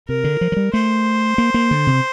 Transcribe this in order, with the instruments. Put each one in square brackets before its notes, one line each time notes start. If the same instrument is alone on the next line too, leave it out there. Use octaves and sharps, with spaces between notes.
[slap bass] C3 [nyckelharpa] A#4
[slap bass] D3
F3
F3
G3
[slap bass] A3 [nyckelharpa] C5
[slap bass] A#3
A#3
D3
C3